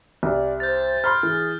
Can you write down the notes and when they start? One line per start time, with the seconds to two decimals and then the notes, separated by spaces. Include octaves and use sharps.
0.23 C2 D5
0.60 C5 G6 A6
1.04 B5 C6 F6
1.23 E3 G#4